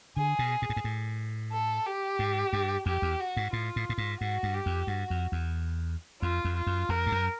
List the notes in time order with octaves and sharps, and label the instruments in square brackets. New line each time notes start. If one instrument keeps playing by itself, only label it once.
[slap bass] D3 [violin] G#4
[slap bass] B2
A#2
A2
G#2
A2
[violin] A4
G4
[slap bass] G#2
G2
[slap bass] F2 [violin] G4
[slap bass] E2
[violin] F#4
[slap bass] G#2
[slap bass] A2 [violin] F4
[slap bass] A2
A2
G#2
[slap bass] G#2 [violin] F#4
[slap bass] G2
[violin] G4
[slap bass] F2
[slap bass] G2 [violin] F#4
[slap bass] F2
E2
[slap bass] F2 [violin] F4
[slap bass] F2
[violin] F4
[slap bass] F#2
[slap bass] F2 [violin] A#4
[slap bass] G2
F#2